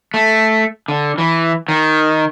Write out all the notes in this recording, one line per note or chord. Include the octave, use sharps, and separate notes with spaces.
A3
D3
E3
D#3